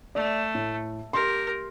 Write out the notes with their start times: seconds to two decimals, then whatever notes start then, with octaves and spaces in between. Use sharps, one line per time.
0.15 A3 D5
0.55 A2
1.13 G4 A#4 C6